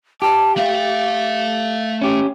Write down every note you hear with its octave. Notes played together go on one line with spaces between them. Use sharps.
G4 A5
A3 E5 F5
C#4 G4